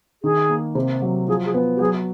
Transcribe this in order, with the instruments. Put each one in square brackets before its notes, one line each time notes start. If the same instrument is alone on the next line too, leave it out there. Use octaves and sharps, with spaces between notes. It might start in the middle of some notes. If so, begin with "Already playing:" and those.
[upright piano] D#3 [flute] G#4
[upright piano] A#3
C3
F#3
[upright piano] F3 [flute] G#4
[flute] G#4
[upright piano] B3
[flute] G4
[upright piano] F#3 [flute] G#4